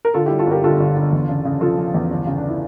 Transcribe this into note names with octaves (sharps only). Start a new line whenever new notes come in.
A#4
D3 F4 A4
E4 G4
G3
F4 A4
G1 G4 A#4
D3 F4 A4
G1
D3
E2
C#3
C#3
F3 F4 A4
F3
E2
G1
C#3
D4
E4